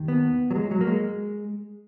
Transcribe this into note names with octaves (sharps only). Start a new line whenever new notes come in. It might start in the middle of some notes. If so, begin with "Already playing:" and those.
Already playing: D#2 D#3
B3
F#3
G#3
F#3
A#3
G#3